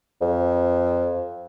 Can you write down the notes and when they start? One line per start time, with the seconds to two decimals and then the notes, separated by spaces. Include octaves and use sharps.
0.21 F2